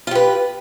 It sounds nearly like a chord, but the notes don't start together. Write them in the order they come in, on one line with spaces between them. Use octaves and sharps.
F4 G4 B4